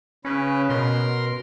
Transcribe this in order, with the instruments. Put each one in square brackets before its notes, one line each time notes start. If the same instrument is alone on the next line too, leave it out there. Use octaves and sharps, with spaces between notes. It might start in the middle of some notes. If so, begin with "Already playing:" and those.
[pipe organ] C#3 B4 [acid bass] C#4
[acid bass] B2 [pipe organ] A#4 C6